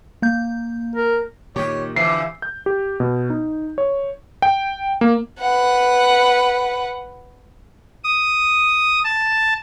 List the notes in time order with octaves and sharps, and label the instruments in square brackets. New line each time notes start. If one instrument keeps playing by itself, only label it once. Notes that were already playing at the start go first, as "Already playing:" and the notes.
[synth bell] A#3 G6
[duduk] A#4
[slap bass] A#2 D#3 [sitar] G4 [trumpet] C#5
[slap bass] D3 [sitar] E3 F3 [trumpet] E5 [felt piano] C7
[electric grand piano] G6
G4
B2
D#4
C#5
G5
A#3
[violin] B4 F#5
[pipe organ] D#6
A5